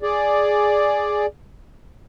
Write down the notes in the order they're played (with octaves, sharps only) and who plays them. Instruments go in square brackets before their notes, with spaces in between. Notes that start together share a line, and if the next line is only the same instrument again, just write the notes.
[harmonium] G#4 D5